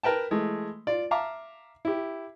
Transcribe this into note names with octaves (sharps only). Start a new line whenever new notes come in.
A#4 B4 G5 A5
E3 G#3 A3
F4 D5
E5 F5 A5 A#5 D6
E4 G4